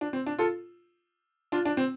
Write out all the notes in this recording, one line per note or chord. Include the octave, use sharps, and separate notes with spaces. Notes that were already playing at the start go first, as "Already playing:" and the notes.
D4
C4
D4
F4 A4
D4 F4
D4
C4